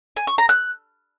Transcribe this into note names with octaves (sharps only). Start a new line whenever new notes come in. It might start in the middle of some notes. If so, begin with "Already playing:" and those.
G#5
C#6
A#5
F#6